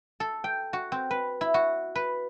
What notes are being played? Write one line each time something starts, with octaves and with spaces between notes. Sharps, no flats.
A4
G5
F#4
C4
B4
E4
F#4
B4